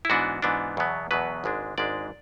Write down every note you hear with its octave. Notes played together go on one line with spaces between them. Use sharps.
E4
G#2 E3 B3 D4 F#4
G#2 E3 B3 D4
E2 B2 F#3 B3
E2 B2 F#3 B3 B4
G#1 G#2 G#3 D4
G#1 G#2 G#3 D4 D5